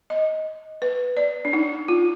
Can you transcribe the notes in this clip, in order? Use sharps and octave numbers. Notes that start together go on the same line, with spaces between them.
D#5
B4
D5
D4
D#4
F4